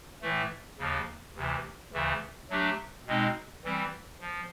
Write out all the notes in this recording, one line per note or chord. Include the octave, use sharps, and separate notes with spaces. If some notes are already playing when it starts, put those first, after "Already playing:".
A2 E3 A3
D#2 C#3 F3
D2 C3 E3
D2 C#3 E3 A3
F#3 A3 D4 G4
B2 G#3 C4 D#4
E3 G3 C4
F3